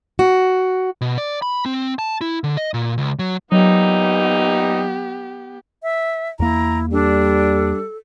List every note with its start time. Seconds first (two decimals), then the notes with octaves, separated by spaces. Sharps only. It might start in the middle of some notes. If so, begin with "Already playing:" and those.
0.19 F#4
1.01 B2
1.18 D5
1.42 B5
1.66 C4
1.99 A5
2.21 E4
2.44 D3
2.57 D#5
2.74 A#2
2.98 C#2
3.19 F#3
3.52 A#2 E3 F#3 B3 D#4 G4
5.83 E5
6.40 E2 A#3 E4 A#5
6.92 G3 D4 A4